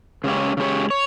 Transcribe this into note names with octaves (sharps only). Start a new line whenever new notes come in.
C#3 G#3 C#4 G4 C#5
C#3 G#3 C#4 G4 C#5
C#5